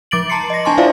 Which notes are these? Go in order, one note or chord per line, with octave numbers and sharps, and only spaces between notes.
F3 D6 A6 D7 F#7
A5 A#5 C6 C7 C#7
D#5 A#6
D4 G#5 A5 C6 C#6
E4 F4 C5 D5 E5 F5